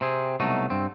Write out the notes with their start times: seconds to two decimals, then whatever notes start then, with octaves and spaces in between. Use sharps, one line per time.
0.01 C3 C4 G#4
0.40 C2 B2 F#3 A3 D#4
0.70 G2 C4